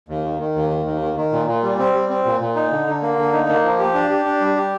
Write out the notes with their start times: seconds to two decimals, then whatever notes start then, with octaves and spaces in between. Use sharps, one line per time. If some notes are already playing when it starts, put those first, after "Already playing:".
0.09 D#2
0.24 D#3
0.39 D#3
0.55 D#2
0.70 D#3
0.86 D#2
1.01 D#3
1.17 D#3
1.32 A#2
1.47 A#2
1.63 G3
1.79 C4
1.94 G3
2.10 C4
2.25 A#2
2.40 A#2
2.55 D#4
2.71 D3
2.87 D3
3.02 A#3
3.18 D3
3.33 D#4
3.48 A#3
3.63 F3
3.79 G4
3.94 D4
4.10 G4
4.25 D4
4.41 G3
4.56 G4